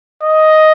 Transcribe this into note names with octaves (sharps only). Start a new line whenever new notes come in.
D#5